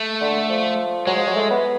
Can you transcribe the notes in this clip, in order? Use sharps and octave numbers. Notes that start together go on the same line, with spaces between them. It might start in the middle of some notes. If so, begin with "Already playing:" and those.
Already playing: A3
D3
F3
F#3 G#3
F3
F#3
A3
B3